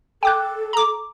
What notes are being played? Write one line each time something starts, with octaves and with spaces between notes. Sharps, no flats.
A4 G5 D6 F#6
A#5 D6